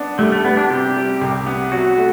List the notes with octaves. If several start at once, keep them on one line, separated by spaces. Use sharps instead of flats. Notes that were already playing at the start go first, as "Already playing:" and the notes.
Already playing: B3 D4
G3 A3
A3
G3 B3
D4
C3 G4
G3
C2
B3
F#3 F#4
A3